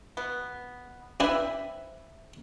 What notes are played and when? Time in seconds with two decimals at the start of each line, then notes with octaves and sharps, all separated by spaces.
0.17 B2 B3
1.20 C4 D4 E4 B4 E5 G#5